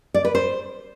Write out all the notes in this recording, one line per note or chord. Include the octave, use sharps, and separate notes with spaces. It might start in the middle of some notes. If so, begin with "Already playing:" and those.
D5
B4
C5